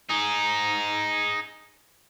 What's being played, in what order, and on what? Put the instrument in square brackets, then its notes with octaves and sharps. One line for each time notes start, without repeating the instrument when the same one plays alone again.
[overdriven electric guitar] D#4 G#4